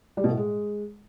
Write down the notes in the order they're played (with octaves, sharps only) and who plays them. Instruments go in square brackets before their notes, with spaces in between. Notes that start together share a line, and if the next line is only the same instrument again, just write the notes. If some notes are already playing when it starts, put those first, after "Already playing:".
[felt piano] G3
B2
A2
G#3